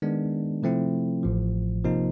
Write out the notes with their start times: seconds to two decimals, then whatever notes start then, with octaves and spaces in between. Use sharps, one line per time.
0.02 D#3 G#3 B3 D4
0.63 C3 F3 A3 C4 E4
1.23 A1 A2 F3
1.84 C3 F3 A#3 D#4